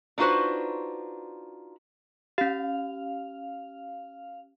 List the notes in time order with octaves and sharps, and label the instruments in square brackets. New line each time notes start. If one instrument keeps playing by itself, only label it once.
[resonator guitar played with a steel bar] D4 D#4 F4 F#4 B4 C5
[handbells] C#4 G4 [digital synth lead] F5